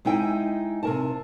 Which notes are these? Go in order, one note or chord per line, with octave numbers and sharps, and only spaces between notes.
G#3 D#4 E4 G5
C3 A#4 A5